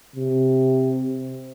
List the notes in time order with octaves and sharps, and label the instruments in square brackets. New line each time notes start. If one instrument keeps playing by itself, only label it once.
[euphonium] C3